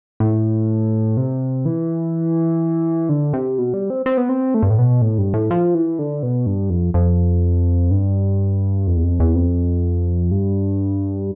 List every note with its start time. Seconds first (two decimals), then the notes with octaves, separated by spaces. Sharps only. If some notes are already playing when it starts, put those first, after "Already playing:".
0.20 A2
1.17 C3
1.65 E3
3.09 D3
3.33 C3
3.58 B2
3.74 G3
3.90 C4
4.06 C4
4.18 B3
4.29 C4
4.54 A3
4.62 G2
4.70 A2
4.79 B2
5.02 A2
5.18 G2
5.34 A2
5.51 F3
5.75 E3
5.99 D3
6.23 B2
6.46 G2
6.70 F2
6.94 F2
7.91 G2
8.87 F2
8.96 E2
9.03 F2
9.20 E2
9.35 F2
10.31 G2